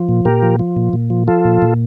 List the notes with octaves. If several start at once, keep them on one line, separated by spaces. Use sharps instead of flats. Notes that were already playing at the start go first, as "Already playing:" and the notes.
Already playing: F3
A#2
A#2 G4 A#4
F3
F3
A#2
A#2
F3
F3 F4 A4
A#2
A#2